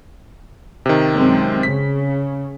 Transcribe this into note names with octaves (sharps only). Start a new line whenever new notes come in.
C3 D#3
F#2 G#3 C4
C#3 B6